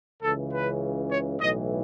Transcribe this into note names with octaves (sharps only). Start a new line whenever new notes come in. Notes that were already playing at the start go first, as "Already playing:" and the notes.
C#2 C#3 E3 A4
B4
C#5
B1 A2 E3 D#5